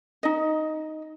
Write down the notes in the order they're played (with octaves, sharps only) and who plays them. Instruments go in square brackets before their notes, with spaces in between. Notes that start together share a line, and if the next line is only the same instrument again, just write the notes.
[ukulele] D#4 D#5